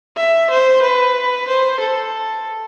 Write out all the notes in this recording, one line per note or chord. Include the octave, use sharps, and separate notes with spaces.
E5
C5
B4
C5
A4